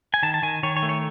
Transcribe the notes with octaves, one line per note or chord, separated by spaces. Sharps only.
G#5
D#3 A5
A5
D#3 G#5
D#3 C#5
C#5
A3
C#5